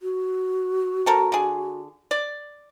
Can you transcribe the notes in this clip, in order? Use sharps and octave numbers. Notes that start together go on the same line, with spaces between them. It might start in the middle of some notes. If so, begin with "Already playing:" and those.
F#4
C4 A4 A#4
D3 G#4
D5